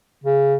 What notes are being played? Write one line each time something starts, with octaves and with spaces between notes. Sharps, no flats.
C#3